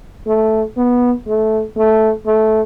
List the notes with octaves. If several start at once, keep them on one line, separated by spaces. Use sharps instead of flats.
A3
B3
A3
A3
A3